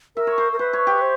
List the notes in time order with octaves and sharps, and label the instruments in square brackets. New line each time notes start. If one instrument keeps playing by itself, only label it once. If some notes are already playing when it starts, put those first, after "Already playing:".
[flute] A#4 [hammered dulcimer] E5
[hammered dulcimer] C#5
C5
[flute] A#4
[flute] B4 [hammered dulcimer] C5
[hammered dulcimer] C#5
G4
[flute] C5